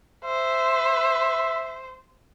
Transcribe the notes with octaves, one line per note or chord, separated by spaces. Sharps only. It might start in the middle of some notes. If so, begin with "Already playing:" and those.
C5 E5